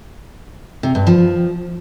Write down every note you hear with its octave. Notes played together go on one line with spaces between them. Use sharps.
C3
G2
F3